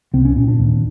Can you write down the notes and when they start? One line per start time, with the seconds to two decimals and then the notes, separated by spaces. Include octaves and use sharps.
0.13 C2 C4
0.25 C#4
0.36 A#2 C#4
0.48 D4
0.59 D#2